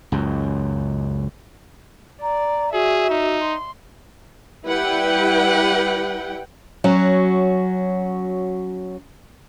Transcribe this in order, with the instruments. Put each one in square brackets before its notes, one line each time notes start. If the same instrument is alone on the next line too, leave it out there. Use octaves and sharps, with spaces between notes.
[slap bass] C#2 F#2
[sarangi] D5 [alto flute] A#5
[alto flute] F#4 [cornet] G#4 [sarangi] E5
[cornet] D#4
[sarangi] C6
[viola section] G3 E4 B4 F#5 G5
[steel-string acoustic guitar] F#3 C#4 F#4